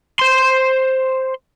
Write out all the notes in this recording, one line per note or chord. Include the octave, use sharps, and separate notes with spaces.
C5 C6